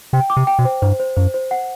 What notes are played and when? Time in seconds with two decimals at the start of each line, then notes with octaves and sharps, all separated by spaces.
0.13 C3 G5
0.30 D6
0.37 C3
0.47 G5
0.59 B2
0.65 C5
0.82 G2 C5
1.00 C5
1.16 F#2 C5
1.34 C5
1.51 F#5